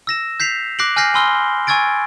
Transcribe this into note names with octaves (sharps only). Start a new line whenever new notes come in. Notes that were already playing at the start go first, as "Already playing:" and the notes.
E6 A#6 E7
G6 B6 C7 F7
D6 F#6 A#6 C7 D7 F#7
G#5 F6 G6 A#6 C7
G#5 B5 C6 E6 F6 G7
G#5 C#6 E6 G#6 A6 D7